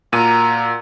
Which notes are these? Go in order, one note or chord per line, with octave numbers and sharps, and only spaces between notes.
A#2 F#4 A#4 D#7